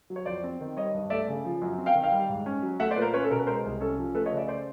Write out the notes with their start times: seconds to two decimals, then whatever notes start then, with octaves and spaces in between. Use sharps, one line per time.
0.10 F#3
0.16 C#5
0.26 F2 C5 D5
0.44 C4
0.61 D#3
0.77 G3 C#5 D#5
0.94 G2
1.10 A3 D5 E5
1.28 C#3
1.45 F3
1.62 F#2
1.78 C4
1.86 F5 G5
1.95 D#3
2.04 F5 G5
2.12 G3
2.29 G#2
2.46 C#4
2.62 F#3
2.80 A3 E5 F#5
2.91 C5 D5
2.96 A#2 B4
3.02 A#4 C5
3.14 C#4 B4 C#5
3.24 A4
3.31 B2 A#4
3.39 B4
3.47 G#3 A#4 C5
3.64 C2
3.80 C#4 A4
3.98 F3
4.15 A3 A4 B4
4.26 C#5 D#5
4.32 C#3
4.37 D5 E5
4.48 C#3 C5 D5